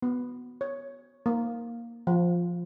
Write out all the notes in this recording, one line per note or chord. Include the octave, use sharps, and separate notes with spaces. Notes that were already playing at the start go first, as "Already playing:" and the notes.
B3
C#5
A#3
F3